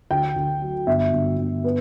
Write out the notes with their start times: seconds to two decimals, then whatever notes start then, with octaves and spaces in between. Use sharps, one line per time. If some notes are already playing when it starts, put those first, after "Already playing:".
0.11 D2 G5
0.36 D2
0.62 F#3
0.87 G1 E5
1.13 G1
1.38 G1
1.64 B3